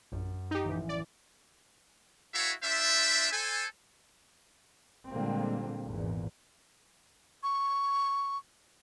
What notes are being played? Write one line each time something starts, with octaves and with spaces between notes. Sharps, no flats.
A#1 F#2
D#4 G4
A1 E3
D5
E4 F#4 A4 C#5 E5 F5
D4 F4 C5 E5
A4 C5 G#5
A#2 D3 G3 G#3 A#3 C4
G#1 E2 A#2
C#6